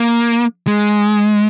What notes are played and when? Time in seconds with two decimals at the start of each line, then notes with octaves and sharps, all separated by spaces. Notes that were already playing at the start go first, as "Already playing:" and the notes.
Already playing: A#3
0.67 G#3